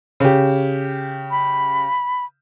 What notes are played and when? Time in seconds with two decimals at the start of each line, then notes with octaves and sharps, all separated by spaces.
0.20 C#3 G4
1.31 B5